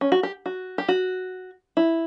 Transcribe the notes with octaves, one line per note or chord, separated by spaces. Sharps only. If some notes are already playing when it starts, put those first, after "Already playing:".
C#4
F#4
G4
F#4
G4
F#4
E4